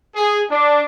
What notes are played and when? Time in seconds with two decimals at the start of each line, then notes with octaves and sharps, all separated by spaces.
0.16 G#4
0.51 D4